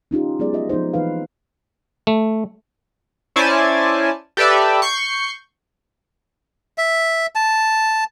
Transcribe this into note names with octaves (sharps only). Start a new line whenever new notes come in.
C#4 D#4 F4 G4
F#3 G#3 B3 G#4 D5
F3 F4 D#5 E5
F3 B3 D#4 C5
E3 A#3 D#4 B4 F5
A3
C#4 E4 C5 D5 G#5 A5
G4 A4 B4 D5 E5
C#6 G6 C7
E5
A5